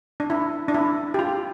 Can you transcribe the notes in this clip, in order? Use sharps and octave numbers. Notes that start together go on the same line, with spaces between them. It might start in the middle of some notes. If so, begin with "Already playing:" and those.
D4
E4
D4
E4
G4
F4